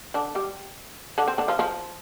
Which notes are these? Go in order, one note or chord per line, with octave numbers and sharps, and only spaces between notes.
D3 D4
G3 G4
D3 D4
C4
D3 D4
F3 F4
F3 F4